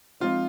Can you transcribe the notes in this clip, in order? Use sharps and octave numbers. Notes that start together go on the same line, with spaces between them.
F3 G#3 C4 D#4 F4